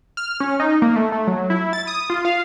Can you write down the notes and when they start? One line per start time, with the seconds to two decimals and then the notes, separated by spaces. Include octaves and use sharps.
0.17 F6
0.40 C#4
0.60 D#4
0.82 A#3
0.96 A3
1.12 A3
1.27 F#3
1.50 E4
1.73 A6
1.87 D#6
2.10 F4
2.25 F5